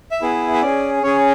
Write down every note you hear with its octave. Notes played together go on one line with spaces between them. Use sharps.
E5
B3 E4 G#4
E5
C#4 G#4 D5
C#4 G#4 C#5